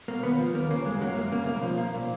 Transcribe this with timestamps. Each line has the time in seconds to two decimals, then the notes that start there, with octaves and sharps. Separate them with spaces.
0.08 B2 A#3
0.23 D#2 B3
0.38 F3
0.54 D#2 A#3
0.70 C#3 A#3
0.85 F#2 G#3
1.01 F#3 A#3
1.16 F#2 A#3
1.31 C#3 A#3
1.47 B1 A#3
1.62 F3
1.78 B1 A#3
1.94 A#2